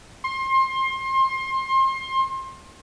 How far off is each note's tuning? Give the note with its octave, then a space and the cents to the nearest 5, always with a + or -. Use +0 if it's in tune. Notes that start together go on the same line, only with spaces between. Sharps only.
C6 +30